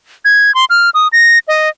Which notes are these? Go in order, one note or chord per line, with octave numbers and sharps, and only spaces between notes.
G#6
C6
F6
D#6
A#6
D#5